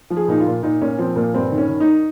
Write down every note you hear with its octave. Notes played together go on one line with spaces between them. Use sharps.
F3
G#4
A#2 D#4
F4
A#2
A#2 D#4
A#2 C#4
F3 C4
A#2 A#3
G2 C4
D#3
C#4
D#3
D#4